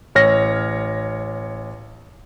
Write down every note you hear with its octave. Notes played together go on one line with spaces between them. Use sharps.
A1 C#5 F6 A#6